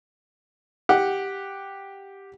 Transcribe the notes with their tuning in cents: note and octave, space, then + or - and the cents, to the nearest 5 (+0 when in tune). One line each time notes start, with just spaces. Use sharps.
G4 +0 F#5 +0